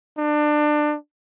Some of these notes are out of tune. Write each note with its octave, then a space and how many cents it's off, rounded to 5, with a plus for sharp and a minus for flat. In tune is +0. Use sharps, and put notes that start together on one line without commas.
D4 +25